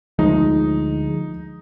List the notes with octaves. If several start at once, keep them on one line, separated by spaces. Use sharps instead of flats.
D2 F3 G#3 D#4